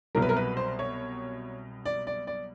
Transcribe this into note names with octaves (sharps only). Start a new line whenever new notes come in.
C2 B2 F#3 A#4
B4
A#4
B4
C5
C#5
D5
D5
D5